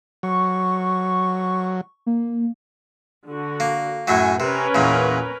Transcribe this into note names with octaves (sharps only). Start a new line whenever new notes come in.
F#3 C#6
A#3
D3 F#4
A#3
F#2 A2 F#3 G#5
C3 C#4 A#4 B4
E2 A#2